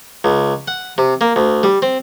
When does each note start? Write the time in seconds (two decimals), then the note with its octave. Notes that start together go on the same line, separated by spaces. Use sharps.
0.24 C#2
0.67 F#5
0.98 C3
1.21 A#3
1.36 D2
1.63 G3
1.82 C4